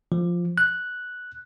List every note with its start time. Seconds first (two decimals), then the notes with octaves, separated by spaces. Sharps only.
0.12 F3
0.58 F#6